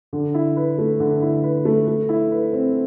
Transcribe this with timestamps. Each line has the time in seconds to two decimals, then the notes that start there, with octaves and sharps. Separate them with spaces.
0.13 D3
0.34 E4
0.56 B4
0.78 A3
1.00 D3
1.22 E4
1.43 B4
1.65 A3
1.88 A3
2.09 E4
2.31 B4
2.53 C4